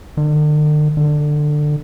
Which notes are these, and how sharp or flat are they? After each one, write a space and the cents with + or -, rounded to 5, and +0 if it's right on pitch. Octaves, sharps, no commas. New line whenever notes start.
D3 +45
D3 +20